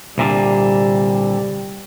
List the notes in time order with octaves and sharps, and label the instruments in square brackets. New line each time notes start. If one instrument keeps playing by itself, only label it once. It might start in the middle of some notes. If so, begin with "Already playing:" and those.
[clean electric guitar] C2 A#2 D3 [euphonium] G3